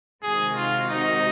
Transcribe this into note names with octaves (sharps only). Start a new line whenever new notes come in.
C3 D#3 G#3 C4 F#4 G#4
F4
D#4